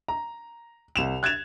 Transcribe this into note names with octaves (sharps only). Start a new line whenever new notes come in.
A#5
C2 E7 F7
F#6 G#6 A6 E7 F7